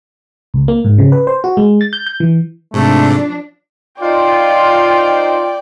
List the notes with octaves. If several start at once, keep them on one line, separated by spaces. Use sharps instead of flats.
C#2
A#3
G#2
C#3
B4
C5
F#4
G#3
A6
G6
G6
E3
G#2 C3 F3 A3 D4
D#4 F4 C5 D5 G5